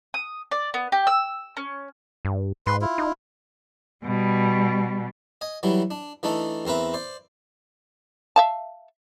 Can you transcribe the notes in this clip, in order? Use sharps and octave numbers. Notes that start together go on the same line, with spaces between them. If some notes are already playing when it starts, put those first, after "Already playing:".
D#6
D5
B3
G4
E6
C#4
G2
G#2 B4 C6
E4 F4
D#4
B2 G3
D#5 G#5
E3 F#3 G3 E4
D4
E3 A3 D4 D#4 A4
E2 C4 A#4 B4 E5
C5 D5
E5 F5 A5